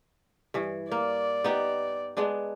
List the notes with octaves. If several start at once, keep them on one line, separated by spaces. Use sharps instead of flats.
G2 E3
A#3 D5
B3 D#4 G4
G#3 B3 D4